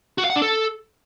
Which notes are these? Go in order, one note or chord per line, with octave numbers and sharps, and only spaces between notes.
F#4
F5
F#5
D4
A4